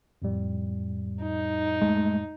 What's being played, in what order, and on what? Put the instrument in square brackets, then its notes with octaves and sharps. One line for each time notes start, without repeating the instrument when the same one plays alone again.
[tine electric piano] F2 A2 G3
[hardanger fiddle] D#4
[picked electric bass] G#3 A3